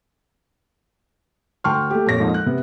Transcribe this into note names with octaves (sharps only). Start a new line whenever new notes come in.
D2 G5 A5 C6 C#6 F6
A3 G4
F2 A#2 C#5 A#6
F2 G#2 F3 A#3
F#6
C3 B3